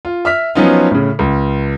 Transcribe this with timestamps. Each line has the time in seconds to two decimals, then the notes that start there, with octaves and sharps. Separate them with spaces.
0.05 F4
0.25 E5 F6 B6
0.55 F3 F#3 B3 C#4 D#4 F4
0.91 A2 C#3
1.19 C#2